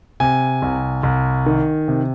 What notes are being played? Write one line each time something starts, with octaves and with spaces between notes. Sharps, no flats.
C3 G#5
C2
C2
D#3
C3